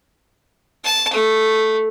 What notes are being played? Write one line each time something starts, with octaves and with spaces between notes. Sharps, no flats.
A5
A3